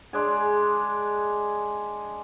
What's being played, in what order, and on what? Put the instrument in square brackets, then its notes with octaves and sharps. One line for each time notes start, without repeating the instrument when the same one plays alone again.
[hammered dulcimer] G#3 D4 G#4